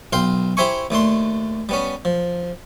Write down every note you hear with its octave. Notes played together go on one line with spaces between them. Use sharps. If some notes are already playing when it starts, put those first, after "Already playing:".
B1 F5 G5 C6
E4 G4 C5 E5 G#5 C#6
D#2 A3 D4 C6
G3 B3 C#4
F3